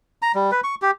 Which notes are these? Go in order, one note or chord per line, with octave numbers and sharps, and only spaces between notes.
A#5
G3
B4
C#6
G4